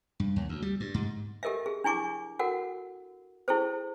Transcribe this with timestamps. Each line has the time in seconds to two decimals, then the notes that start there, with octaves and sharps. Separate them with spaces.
0.20 G2
0.36 D#2
0.49 D2
0.62 G3
0.80 G2
0.94 G#2
1.43 G4 A4 A#4 D#5 E5
1.66 G#4
1.84 D4 E4 G#5 C#6 D6
2.39 F#4 A4 A#4 F#5
3.48 E4 G#4 A4 C5